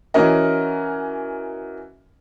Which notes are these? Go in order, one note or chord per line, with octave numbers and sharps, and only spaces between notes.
E3 C#4 F#4 A#4 D#5